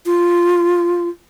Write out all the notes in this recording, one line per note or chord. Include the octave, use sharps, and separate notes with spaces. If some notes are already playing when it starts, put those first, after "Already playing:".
F4